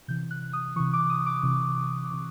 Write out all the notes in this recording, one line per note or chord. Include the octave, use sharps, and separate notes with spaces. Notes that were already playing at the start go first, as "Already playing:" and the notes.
C3 E3 G6
F#6
D#6
C3 E3 C#6
D6
D#6
D6
C3 E3
C3 E3